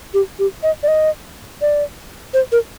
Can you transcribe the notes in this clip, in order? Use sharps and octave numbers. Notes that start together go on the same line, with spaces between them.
G4
G4
D#5
D5
D#5
D5
C5
A#4